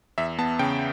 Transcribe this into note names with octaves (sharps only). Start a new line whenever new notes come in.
E2 E5
B3 A5
C#3 G5